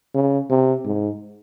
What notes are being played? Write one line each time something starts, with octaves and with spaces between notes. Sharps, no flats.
C#3
C3
G#2